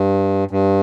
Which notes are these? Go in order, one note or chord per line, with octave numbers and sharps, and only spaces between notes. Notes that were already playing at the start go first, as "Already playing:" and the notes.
Already playing: G2
G2